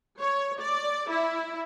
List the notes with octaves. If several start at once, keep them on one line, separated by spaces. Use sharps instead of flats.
C#5
D5
E4